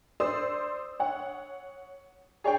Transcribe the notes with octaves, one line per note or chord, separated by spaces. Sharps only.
C5 D5 D#6 E6
C#5 F#5
G#4 C#5 D5 G5